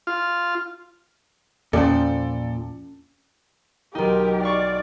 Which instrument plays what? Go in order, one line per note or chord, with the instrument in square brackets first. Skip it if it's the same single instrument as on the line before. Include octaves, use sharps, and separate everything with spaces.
[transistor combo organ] F4
[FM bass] E2 [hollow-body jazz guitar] A#2 F3 C5 [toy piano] C#4 D6 [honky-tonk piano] A4 D5
[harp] B1 D#4 [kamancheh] G4 A#4
[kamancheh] D5 [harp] F5 C#6 D6